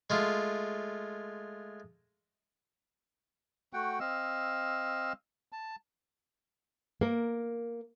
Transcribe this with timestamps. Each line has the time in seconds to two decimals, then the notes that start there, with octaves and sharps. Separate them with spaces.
0.10 G#3 A3 F4
3.73 A3 F#4 F#5 G5
4.00 C4 D#5 F5 E6
5.52 A5
7.01 A#3 A#4